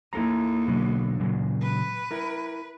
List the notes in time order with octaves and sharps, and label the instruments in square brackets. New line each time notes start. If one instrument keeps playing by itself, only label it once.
[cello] D#2 [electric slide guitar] E4 A4 A#5
[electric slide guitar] B2 D3 F#3
A#2 C#3 F#3
[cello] B4
[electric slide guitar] E4 A#4